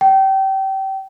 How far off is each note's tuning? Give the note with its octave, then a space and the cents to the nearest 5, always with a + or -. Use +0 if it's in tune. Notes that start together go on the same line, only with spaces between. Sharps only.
G5 -25